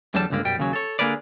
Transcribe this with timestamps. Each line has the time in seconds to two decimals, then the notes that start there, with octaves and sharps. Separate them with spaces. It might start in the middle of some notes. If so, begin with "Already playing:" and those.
0.14 E2 D3 F#3 G3 A5
0.30 C#2 G2 D3 A#3
0.45 B1 F#2 G3 G5
0.58 D#2 C#3 F#3
0.73 A4 C#5
0.99 D3 A#3 G#4 A#4 B4 D5